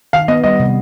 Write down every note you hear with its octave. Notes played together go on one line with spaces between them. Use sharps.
D#3 F5
B3 D#5
G3 D#5
C3